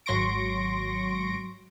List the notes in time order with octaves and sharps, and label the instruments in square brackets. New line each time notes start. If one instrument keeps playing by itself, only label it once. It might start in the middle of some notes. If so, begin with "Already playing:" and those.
[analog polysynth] G#1 F#3 C6 C#6 A#6 D7